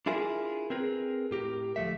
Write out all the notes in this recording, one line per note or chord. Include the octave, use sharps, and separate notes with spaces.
D4 E4 F4 G#4 A#4 E5
C4 G#4 A#4 B4
A2 G4 A#4
D2 F3 A3 E5